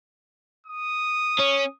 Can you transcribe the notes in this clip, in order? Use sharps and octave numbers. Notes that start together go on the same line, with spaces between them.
D#6
C#4